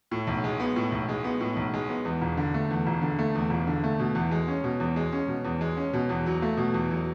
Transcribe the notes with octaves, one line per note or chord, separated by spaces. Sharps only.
A2
B1
G#3
B3
A2
B1
G#3
B3
A2
B1
G#3
B3
E2
E1
D3
A3
E2
E1
D3
A3
E2
E1
D3
A3
B2
E2
G#3
C#4
B2
E2
G#3
C#4
B2
E2
G#3
C#4
B2
E2
F#3
A3
B2
E2
F#3